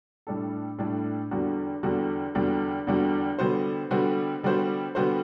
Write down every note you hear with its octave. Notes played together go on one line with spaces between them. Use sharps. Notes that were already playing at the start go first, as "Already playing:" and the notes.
A2 G3 D4 A4
A2 G3 D4 A4
E2 D3 G3 D4 F#4
E2 D3 G3 D4 F#4
E2 D3 G3 D4 F#4
E2 D3 G3 D4 F#4
D3 G3 B3 F#4 C5
D3 G3 B3 F#4 C5
D3 G3 B3 F#4 C5
D3 G3 B3 F#4 C5